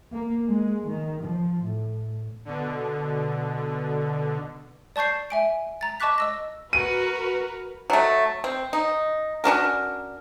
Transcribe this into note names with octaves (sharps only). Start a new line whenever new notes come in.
A#3
G#3
D#3
F3
A2
B2 D3
D5 A5 C#6 G6 C7
E5 G#5 D7
A#5 A6
D#5 A5 C#6 D6 F#6 B6
D#5 E6 A#6
F#4 A#4 B4 D#7
F#3 A3
C4
D#4
C#4 D4 F#4 A#4